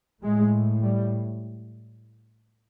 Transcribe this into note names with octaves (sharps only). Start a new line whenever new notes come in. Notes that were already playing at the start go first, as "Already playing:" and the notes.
A2 G#3
G3